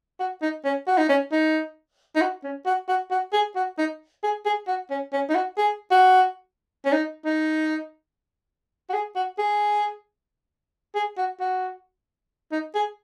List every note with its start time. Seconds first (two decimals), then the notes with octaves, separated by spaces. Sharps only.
0.20 F#4
0.42 D#4
0.65 C#4
0.87 F#4
0.98 D#4
1.09 C#4
1.32 D#4
2.16 D#4
2.22 F#4
2.44 C#4
2.66 F#4
2.89 F#4
3.11 F#4
3.33 G#4
3.56 F#4
3.78 D#4
4.23 G#4
4.45 G#4
4.67 F#4
4.90 C#4
5.13 C#4
5.30 D#4
5.35 F#4
5.57 G#4
5.91 F#4
6.85 C#4
6.92 D#4
7.25 D#4
8.89 F#4
8.93 G#4
9.16 F#4
9.38 G#4
10.95 G#4
11.18 F#4
11.40 F#4
12.52 D#4
12.75 G#4